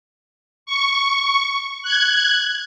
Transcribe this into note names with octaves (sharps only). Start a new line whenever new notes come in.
C#6
F#6 G#6